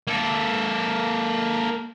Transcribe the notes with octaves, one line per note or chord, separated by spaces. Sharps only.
A#3 A4